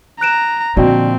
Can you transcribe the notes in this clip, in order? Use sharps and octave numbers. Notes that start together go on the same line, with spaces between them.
A#5 F#6 D7 E7
A#2 D3 F3 C4 F#4 D5 D#5 G5